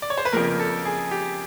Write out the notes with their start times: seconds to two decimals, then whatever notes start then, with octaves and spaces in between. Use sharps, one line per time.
0.02 D5
0.10 C#5
0.18 C5
0.25 B4
0.32 F2 C#3 F3 A#3 A#4
0.59 A4
0.85 G#4
1.11 G4